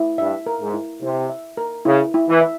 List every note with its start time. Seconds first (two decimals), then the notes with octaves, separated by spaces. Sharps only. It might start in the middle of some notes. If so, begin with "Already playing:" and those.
Already playing: E4
0.18 G2 E5
0.46 A#4
0.61 G#2
0.74 E4
1.02 C3 E4
1.30 E5
1.57 A#4
1.85 C#3 E4
2.14 E4
2.28 E3
2.41 E5